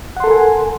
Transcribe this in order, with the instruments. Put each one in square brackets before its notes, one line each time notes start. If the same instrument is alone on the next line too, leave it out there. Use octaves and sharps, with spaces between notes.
[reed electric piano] F#5
C6
A4
A#4
G#5